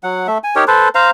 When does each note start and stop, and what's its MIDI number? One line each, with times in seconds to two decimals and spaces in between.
0.03 0.27 54
0.03 0.27 78
0.27 0.38 57
0.27 0.38 76
0.44 0.55 80
0.56 0.64 63
0.56 0.64 67
0.56 0.64 70
0.56 0.64 73
0.68 0.89 69
0.68 0.89 71
0.68 0.89 72
0.95 1.10 72
0.95 1.10 77
0.95 1.10 82